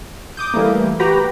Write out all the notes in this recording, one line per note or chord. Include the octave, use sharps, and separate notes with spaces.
D6 D#6 G6
E3 G3 A3 A#3
F#4 G4 B4 G5 A#5 B5